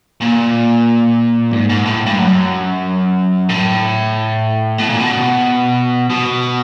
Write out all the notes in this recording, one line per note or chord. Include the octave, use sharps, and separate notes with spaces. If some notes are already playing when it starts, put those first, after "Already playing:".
A#2
G#2
G#2
A2
G2
F#2
A2
B2
A#2
B2
B2